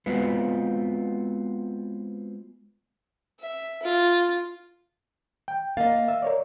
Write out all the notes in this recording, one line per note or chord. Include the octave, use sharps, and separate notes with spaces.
G#3 B3 C4 F4 F#4 B4
E5
F4
G5
A#3 D#5 F5 A6
E5
A#4 C#5 D5